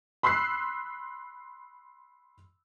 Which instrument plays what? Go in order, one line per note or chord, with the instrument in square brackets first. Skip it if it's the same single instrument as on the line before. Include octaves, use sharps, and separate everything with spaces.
[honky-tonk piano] B5 C6 E6 F#6 C7